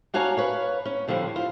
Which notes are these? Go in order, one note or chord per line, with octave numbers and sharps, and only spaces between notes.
D4 F#4 C#5 F5 G#5 A#5
B4 C#5 F5
C#4
A2 D3 F3 G3 C5
F4 C5